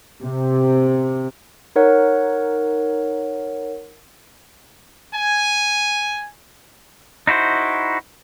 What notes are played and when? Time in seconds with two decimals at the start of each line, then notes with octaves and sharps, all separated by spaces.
0.20 C3
1.76 D#4 A#4 C#5 F#5
5.14 G#5
7.27 D#4 E4 F#4 C5